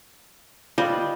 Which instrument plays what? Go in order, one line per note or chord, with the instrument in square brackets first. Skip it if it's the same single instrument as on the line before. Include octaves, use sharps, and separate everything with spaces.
[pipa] G3 [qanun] F4 B4 D#5